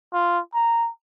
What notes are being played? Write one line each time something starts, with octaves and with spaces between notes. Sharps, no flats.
F4
A#5